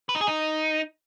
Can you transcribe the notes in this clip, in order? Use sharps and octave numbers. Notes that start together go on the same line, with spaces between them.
B4
D#4
G#4
D#4